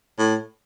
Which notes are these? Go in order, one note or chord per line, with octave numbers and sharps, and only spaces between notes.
A2